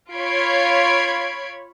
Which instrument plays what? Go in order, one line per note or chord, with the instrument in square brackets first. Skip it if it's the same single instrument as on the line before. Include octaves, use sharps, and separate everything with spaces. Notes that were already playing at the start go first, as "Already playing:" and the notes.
[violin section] F4 C#5 B5 G#6 C7 D7